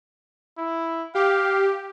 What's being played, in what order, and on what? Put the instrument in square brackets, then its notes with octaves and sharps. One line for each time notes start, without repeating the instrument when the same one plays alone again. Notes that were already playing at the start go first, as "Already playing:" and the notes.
[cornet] E4
[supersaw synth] G4 [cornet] F5